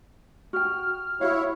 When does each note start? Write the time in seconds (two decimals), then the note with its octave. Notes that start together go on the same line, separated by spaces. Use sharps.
0.53 F#4 G5 F6
1.21 E4 F#4 C#5 F5